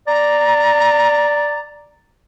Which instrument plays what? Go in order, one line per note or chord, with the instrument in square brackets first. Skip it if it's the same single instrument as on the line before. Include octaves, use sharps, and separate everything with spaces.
[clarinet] D5 [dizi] A#5